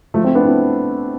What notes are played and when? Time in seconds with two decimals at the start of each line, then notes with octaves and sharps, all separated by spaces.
0.14 F3 A3
0.24 A3 C4
0.35 B3 D4
0.45 C4 E4